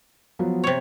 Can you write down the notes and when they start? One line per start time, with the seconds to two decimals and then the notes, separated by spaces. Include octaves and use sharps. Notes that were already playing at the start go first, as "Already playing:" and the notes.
0.39 F3 F#3 B3
0.64 C3 C#5